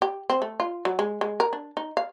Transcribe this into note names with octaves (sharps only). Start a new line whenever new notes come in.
G4
C4
A3
F4
F#3
G#3
G#3
A#4
D4
D#4
F5